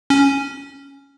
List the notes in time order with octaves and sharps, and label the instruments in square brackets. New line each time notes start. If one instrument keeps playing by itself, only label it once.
[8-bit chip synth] C#4